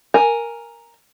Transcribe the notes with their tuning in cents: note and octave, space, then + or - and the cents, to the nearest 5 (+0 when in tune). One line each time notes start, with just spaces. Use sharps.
A#4 +0 G#5 +0